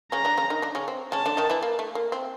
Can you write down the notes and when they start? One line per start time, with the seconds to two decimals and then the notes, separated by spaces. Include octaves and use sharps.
0.12 C#3 C#4 A#5
0.25 D3 D4
0.38 C#3 C#4
0.50 D#3 D#4
0.62 D3 D4
0.75 C#3 C#4
0.88 C4
1.12 C#3 C#4 A5
1.26 D3 D4
1.37 D#3 D#4
1.50 E3 E4
1.63 A#3
1.79 A3
1.95 A#3
2.12 C4